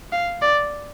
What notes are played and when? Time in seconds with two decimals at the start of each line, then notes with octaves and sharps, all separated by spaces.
0.12 F5
0.42 D5